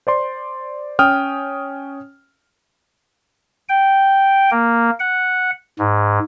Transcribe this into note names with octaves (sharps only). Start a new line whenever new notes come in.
C5 D5 C6
C#4 G5 D#6 F6
G5
A#3
F#5
G#2